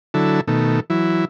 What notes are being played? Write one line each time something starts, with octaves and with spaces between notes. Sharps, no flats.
D3 F#3 E4 A4
B2 D#3 A3
E3 F#3 E4